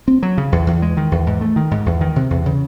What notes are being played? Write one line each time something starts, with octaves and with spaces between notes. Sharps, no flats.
C4
F#3
C#3
E2
E2
G#3
D#3
E2
G#2
A3
D#3
G#2
E2
D#3
C3
E2
C#3